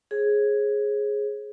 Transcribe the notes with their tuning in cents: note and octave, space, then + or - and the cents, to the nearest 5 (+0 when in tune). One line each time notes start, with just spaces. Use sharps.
G#4 +5 C#5 -45